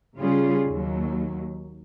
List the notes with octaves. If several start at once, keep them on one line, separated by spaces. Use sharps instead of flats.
C#3 G3 C#4 F4 G#4
D#2 F#3